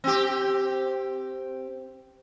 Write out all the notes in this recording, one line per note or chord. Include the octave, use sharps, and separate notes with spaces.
C4 G4